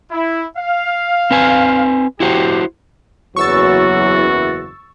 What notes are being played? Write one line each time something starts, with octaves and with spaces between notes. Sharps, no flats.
E4
F5
C4 B4 G#5
E4 F#4 G4 C5
F#1 E2 E3 F#3 F#4 C#6 E6 A6